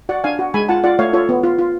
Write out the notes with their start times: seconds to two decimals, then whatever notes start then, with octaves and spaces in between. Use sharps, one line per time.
0.09 F#4 D5 F#5
0.24 D4 F5 G#5
0.39 F#4
0.54 G#3 G#5 B5
0.69 F4 F#5 A5
0.84 F4 D5 F#5
0.99 A3 C#5 F5
1.13 F4 A4 C#5
1.29 B3
1.44 F4
1.59 F4